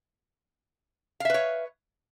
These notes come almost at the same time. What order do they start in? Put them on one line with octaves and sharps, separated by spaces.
F5 E5 B4 C#5